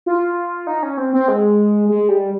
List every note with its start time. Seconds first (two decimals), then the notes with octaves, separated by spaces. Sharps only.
0.06 F4
0.67 D#4
0.83 C#4
0.97 C4
1.13 C4
1.28 G#3
1.89 G#3
2.09 G3